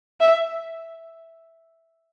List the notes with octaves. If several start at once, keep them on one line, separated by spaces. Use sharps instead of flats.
E5